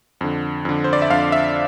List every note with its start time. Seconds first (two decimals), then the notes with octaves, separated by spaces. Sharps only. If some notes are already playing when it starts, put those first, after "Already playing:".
0.21 F2 D3
0.65 F2 D3
0.84 C5
0.93 D5
1.02 E5
1.10 F2 D3 F5
1.32 E5